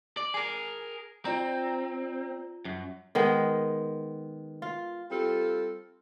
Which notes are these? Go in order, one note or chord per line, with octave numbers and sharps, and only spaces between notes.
D5
G#4 A#4 G#5
C4 F4 D5 A#5
F#2
D#3 G#3 B3
F4
G3 C4 F4 A4